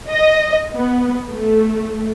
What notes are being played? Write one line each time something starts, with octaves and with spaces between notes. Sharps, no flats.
D#5
B3
A3